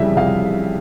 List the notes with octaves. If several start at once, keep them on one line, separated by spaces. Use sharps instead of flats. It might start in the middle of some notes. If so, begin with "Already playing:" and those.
Already playing: F2 C#3 E3 G3 E5
F2 F5